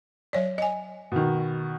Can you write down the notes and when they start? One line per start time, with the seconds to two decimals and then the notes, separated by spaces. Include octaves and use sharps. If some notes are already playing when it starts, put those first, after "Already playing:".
0.33 F#3 C#5 D5
0.58 D#5 G#5
1.12 B2 D#3